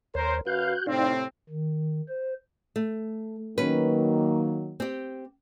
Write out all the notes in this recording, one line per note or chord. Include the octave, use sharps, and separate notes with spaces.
D#2 A#4 C5 C#5
F#2 F#4 B4 F5 F#6 G6
A2 C3 C4 D#4 D5 F5
D#3
C5
A3
D#3 F#3 A#3 C#4 B4
C4 G4